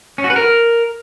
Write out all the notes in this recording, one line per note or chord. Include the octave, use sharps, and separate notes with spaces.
C#4
F#4
B4
A#4